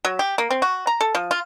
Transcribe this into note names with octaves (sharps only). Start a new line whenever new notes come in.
F#3
G4
A#3
C4
F#4
A#5
A4
F3
F4